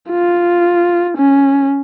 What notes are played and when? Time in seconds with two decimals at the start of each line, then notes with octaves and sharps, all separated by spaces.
0.10 F4
1.18 C#4